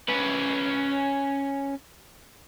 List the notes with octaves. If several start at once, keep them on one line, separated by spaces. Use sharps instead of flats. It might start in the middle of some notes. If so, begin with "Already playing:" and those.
C#4 B4